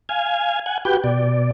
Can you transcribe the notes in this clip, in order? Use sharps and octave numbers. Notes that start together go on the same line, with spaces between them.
F5 G#5
F#5 G#5
F#4 G4 B4 G5
B2 D5